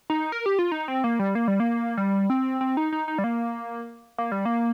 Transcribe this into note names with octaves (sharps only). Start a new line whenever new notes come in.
D#4
A#4
G4
F4
D#4
C4
A#3
G3
A#3
G3
A#3
G3
C4
C4
D#4
D#4
D#4
G3
A#3
A#3
G3
A#3